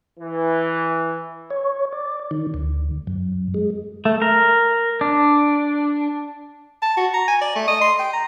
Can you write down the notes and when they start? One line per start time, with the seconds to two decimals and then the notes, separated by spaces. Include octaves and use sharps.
0.18 E3
1.50 C#5
1.92 D5
2.31 D#3
2.54 D2
3.07 F#2
3.54 G#3
4.05 A3
4.22 A#4
5.01 D4
6.82 A5
6.97 F#4
7.14 A#5
7.28 G#5
7.41 D5
7.56 A3
7.68 D#5
7.81 C6
7.99 G5
8.13 A#5